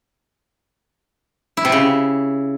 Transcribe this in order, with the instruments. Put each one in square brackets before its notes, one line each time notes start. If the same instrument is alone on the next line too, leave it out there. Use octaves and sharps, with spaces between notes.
[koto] E4
C3
C#3